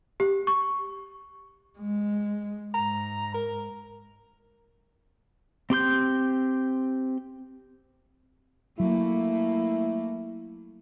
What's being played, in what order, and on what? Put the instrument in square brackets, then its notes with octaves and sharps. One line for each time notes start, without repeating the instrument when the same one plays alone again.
[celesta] G4
C#6
[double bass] G#3
[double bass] G#2 [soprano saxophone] A#5
[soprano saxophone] A#4
[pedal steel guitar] C4 G4 C6 G6
[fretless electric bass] F#3 [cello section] A3 A#3 [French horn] E4